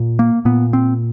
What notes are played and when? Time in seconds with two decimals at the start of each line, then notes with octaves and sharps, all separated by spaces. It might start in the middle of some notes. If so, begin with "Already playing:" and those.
Already playing: A#2
0.19 A#3
0.45 A#2 B3
0.73 C4